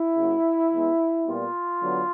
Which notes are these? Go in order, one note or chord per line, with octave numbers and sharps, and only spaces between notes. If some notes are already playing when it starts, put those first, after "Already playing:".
Already playing: E4
C#3 F#3 A#3
E3 G#3 B3
A#2 G3 B3 F4
D3 F#3 B3